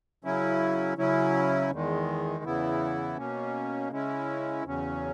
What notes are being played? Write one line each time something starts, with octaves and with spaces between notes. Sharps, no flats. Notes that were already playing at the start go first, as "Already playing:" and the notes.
C#3 F#3 C#4 E4
C#3 F#3 C#4 E4
E2 D#3 G#3
E2 C#3 E3 B3 E4
B2 A#3 C#4
C#3 G#3 C#4 E4
E2 C#3 F#3 C#4